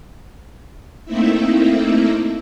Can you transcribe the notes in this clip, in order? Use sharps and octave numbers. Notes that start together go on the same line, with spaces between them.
A3 A#3 C4 D#4 E4 E5